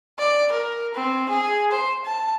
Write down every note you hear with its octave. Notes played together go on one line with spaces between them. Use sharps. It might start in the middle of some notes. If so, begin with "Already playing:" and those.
D5
A#4
C4
G#4
C5
A5